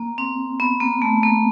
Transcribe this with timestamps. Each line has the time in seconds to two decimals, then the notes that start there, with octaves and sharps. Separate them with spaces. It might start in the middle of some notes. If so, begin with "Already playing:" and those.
Already playing: A#3
0.18 C4
0.60 B3
0.80 A#3
1.02 A3
1.23 A#3